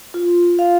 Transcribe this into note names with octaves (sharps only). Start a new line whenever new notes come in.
F4
F5